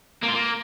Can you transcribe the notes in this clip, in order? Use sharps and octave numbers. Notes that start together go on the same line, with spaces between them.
A#3
F4
A#3